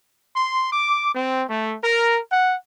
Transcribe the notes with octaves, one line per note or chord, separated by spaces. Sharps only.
C6
D6
C4
A3
A#4
F#5